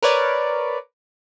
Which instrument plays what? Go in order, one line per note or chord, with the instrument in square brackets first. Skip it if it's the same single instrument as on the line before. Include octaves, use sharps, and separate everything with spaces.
[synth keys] A#4 B4 C#5 D5